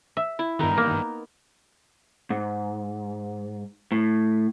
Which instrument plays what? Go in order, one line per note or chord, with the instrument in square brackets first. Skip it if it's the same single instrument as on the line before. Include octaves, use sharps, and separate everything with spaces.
[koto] E5
[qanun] E4
[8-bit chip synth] G2 D#3 [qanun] B3 D#4 A#4
[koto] A#3
[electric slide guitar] G#2
A2